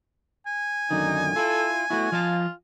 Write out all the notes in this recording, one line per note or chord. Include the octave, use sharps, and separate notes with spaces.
G#5
F#2 D3 D#3 D#4
E4 F4 A4
A3 B3 E4 F#4
F3 F4 D#5 A5